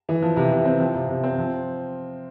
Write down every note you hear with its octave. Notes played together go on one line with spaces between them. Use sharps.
E3
F3
C3
C3
C4
F3
C3
C3
C4
F3